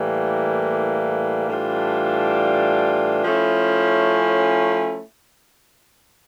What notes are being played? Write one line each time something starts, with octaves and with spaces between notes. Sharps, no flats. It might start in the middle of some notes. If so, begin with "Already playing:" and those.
Already playing: A2 E3 G3 A#3
A2 E3 G3 D4 F4
F3 A3 C#4 E4